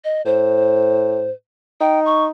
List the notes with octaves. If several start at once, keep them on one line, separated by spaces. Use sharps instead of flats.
D#5
A2 C5
D#4 G5
C#6